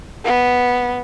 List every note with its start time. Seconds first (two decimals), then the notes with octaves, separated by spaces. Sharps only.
0.25 B3